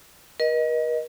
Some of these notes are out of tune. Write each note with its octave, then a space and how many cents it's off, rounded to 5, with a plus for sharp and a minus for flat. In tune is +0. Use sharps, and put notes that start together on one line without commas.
A#4 +45 D#5 +0